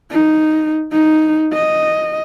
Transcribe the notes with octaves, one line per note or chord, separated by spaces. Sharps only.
D#4
D#4
D#5